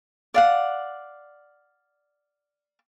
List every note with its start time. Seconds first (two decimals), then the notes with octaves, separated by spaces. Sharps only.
0.34 D5 F5 F#5